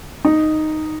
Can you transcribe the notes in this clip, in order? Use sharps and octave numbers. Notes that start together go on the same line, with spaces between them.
D#4